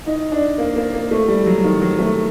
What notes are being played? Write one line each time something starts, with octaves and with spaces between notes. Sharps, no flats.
D#4
D4
A#3
A#3
A#3
A3
G3
F#3
D#3
F#3
A3